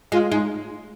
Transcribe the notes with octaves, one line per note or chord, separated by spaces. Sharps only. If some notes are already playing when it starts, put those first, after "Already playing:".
G#3 F4
G#3 D#4